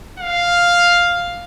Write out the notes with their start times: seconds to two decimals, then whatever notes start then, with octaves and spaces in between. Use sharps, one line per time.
0.19 F5